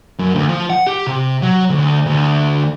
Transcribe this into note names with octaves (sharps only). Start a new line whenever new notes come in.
F#2
D2
F3
F#5
G4
C3
F#3
D2
D2